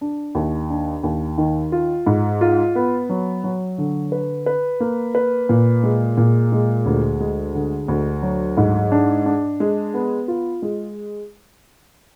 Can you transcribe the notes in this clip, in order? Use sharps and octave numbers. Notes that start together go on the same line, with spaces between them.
D4
D#2
D4
D#2
D#3
F4
G#2
F4
B3
F#3
F#3
D3
B4
B4
A#3
B4
A#2
G#3
A#2
G#3
D2
G#3
D3
D2
F#3
G#2
D4
D4
G#3
B3
F4
G#3